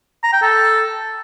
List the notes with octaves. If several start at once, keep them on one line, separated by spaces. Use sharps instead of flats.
A#5
G5
A4